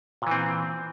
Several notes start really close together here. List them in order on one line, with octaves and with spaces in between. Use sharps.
A#2 E3 C4